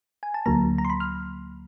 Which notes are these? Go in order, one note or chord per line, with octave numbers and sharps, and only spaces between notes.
G#5
A5
D2 D3 F#3 A#3 A#5
A#5
C6
B5
F6